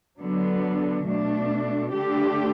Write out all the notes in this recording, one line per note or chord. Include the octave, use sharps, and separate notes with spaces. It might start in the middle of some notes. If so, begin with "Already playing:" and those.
D3 F#3 B3 D4
B2 A3 D4
D3 A3 D4 G4